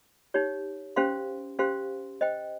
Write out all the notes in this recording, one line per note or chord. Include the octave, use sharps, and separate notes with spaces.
D#4 G4 C#5
C#4 G4 C5 F5 C6
C#4 G4 C5 F5 C6
C5 D#5 G5